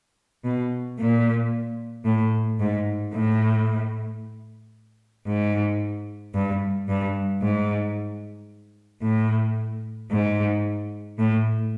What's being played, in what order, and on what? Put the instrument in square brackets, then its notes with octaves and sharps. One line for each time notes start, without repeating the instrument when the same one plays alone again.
[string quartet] B2
A#2
A2
G#2
A2
G#2
G2
G2
G#2
A2
G#2
A2